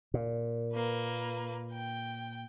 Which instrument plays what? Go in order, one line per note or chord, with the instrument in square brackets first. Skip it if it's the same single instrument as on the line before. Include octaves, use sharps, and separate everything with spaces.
[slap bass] A#2
[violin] A#3 B4
G5